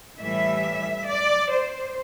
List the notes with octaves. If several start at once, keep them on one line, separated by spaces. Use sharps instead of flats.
A2 E3 G3 E5
D5
C5